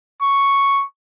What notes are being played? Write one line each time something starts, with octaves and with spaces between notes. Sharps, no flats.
C#6